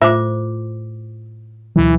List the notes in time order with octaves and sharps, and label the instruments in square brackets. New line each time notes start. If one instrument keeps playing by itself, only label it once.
[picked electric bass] A2 [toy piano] F4 C5 D6 [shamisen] E5
[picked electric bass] D2 B2 F#3 [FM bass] E3